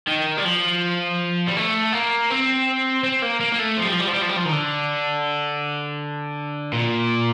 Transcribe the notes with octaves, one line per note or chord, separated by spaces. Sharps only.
D#3
G3
F3
G3
A3
A#3
C4
C4
A#3
A#3
A#3
A3
F3
G3
F3
G3
F3
G3
F3
G3
F3
D#3
D3
A#2